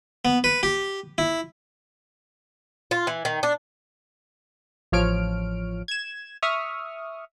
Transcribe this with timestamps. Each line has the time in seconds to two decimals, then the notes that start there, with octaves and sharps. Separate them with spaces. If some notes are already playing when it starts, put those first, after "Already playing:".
0.25 B3
0.44 B4
0.63 G4
1.18 E4
2.91 F4
3.07 E3
3.25 D#3
3.43 D4
4.92 A1 F3 C#5 F6 D7
5.88 G#6 E7
6.42 E5 C#6 D#6 F6